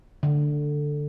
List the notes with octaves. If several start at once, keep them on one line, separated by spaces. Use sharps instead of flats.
D3